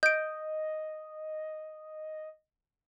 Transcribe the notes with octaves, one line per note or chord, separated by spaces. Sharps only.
D#5 G6 D7